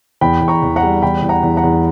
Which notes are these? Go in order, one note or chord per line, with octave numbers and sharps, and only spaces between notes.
E2 G5 B5
E2
A#5 C#6
E2
F#5 A#5
G3
E2 G5 B5
E2
F#5 A#5
E2
F#5 A#5
E2